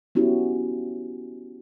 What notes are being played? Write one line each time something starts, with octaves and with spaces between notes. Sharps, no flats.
B3 C#4 E4 F#4 G4